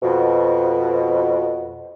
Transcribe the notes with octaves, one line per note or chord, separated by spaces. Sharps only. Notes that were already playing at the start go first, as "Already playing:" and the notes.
F2 B2